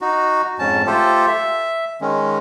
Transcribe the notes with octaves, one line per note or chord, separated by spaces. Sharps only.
D#4 F#4
F2 G#2 C#4 A5
A3 F4 G4 A4 C5
E5
D#3 G#3 C#4